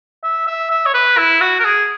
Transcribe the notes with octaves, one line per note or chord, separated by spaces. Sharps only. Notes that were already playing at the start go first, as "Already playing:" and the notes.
E5
E5
E5
C#5
B4
E4
F#4
A#4
G#4